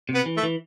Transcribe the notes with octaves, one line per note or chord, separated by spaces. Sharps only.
C3
B3
E3
A3
E3